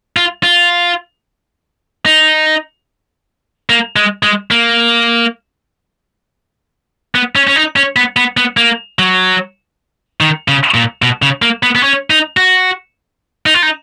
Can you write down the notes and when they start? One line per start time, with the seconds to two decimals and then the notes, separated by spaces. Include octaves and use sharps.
0.17 F4
0.43 F4
2.06 D#4
3.69 A#3
3.96 G#3
4.23 G#3
4.51 A#3
7.15 B3
7.36 C#4
7.47 C#4
7.56 D#4
7.76 C#4
7.96 B3
8.17 B3
8.37 B3
8.57 A#3
8.99 F#3
10.21 D#3
10.48 C#3
10.74 A#2
11.02 B2
11.22 C#3
11.42 A#3
11.63 B3
11.75 B3
11.83 C#4
12.10 D#4
12.37 F#4
13.46 D#4
13.54 F4
13.63 D#4